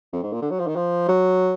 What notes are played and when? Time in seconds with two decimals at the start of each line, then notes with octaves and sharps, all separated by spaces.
0.13 F2
0.23 G#2
0.33 A#2
0.42 D3
0.51 F#3
0.60 F3
0.67 D#3
0.76 F3
1.08 F#3